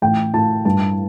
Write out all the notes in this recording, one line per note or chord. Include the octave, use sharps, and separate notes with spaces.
A1 G5
A2 A5
G2 A5